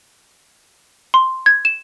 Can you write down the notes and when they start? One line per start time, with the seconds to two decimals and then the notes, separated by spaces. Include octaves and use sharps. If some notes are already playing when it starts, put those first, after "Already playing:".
1.14 C6
1.46 G#6
1.65 E7